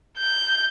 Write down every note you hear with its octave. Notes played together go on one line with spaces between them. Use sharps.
G6